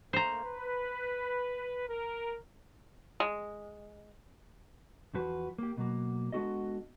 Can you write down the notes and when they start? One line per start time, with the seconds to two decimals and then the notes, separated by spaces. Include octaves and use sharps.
0.13 A3 A#3 C5 A#5
0.43 B4
1.88 A#4
3.20 G#3
5.14 E2 F3 F#4 B4
5.58 A#3 G4
5.77 B2 F#3 A#3
6.32 G#3 B3 D4 F#4 A4 D#5